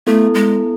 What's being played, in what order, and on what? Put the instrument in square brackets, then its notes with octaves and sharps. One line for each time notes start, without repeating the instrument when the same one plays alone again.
[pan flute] A3 [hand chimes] B3 E4 A4
[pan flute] G#3